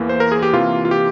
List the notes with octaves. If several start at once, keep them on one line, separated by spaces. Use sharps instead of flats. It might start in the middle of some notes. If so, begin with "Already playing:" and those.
Already playing: E2 E3 A#3
C5
A#4
G#4
G4
C3 E3 A#3 F4
F4
G4